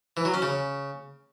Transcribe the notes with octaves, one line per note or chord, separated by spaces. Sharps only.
E3
F#3
C#4
C#3